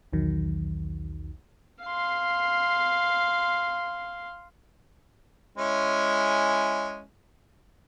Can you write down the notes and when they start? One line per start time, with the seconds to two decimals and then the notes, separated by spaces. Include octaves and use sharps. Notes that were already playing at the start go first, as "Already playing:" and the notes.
0.13 B1 E2 D#3 F#3
1.83 F5 C6
5.58 G#3 C#4 E4